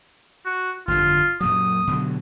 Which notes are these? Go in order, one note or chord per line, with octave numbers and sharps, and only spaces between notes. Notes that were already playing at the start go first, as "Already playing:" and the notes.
F#4
G1 F2 D3 F4
F#2 A#2 F#3 D#6
B2 D3 F#3